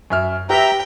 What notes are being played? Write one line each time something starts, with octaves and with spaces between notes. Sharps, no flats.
F#2 E5 F6
G4 B4 E5 G5 A#5